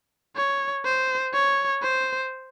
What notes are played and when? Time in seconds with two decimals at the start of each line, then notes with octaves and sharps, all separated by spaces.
0.36 C#5
0.85 C5
1.34 C#5
1.82 C5